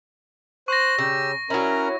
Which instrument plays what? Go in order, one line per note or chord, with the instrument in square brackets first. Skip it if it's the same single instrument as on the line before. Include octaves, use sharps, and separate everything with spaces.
[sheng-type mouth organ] C5 F#6 [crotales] C#6 A#6
[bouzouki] C#3 [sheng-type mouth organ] G4 E6
[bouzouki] F#3 E4 [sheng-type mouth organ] C#4 A#4 A#5